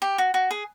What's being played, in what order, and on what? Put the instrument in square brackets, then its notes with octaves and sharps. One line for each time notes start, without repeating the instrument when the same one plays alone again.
[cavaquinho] G4
F#4
F#4
G#4